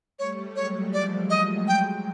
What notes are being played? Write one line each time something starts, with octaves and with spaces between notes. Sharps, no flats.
G3 A3 C#5
F#3 G#3 C#5
F3 G3 D5
F3 G3 D#5
F#3 G#3 G5